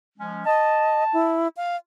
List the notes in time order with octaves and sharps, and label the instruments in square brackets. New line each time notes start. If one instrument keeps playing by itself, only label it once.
[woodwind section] F3 G#3 C#4
[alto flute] D#5 [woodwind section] A5
[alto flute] E4
F5